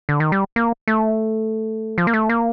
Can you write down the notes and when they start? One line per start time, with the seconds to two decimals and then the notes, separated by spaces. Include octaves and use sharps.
0.09 D3
0.20 D#3
0.32 G3
0.56 A#3
0.88 A3
1.98 F3
2.07 A#3
2.13 A3
2.29 A#3